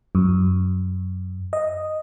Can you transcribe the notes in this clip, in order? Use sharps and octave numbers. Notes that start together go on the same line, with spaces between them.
F#2
D#5